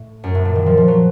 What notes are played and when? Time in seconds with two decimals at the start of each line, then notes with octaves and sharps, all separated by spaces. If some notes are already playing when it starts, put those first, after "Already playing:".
Already playing: A2
0.24 F#2
0.35 A2
0.45 A#2
0.55 D#3
0.66 F3
0.77 F3
0.88 F#3